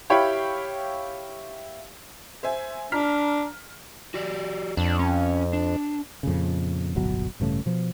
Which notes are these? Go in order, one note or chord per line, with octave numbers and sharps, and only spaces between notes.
E4 G4 C#5 F5 G5 B5
C5 E5 G#5
D4 A#5 F6 B6
F#4 G4 D5
F2 D4
C#4
D4
F2 A#2 C#3
D1 G1 B2 F#3
A1 G2 C#3 A3
B2 F3